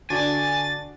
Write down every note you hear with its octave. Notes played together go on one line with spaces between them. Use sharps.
D3 D4 F#4 D5 G#5 A6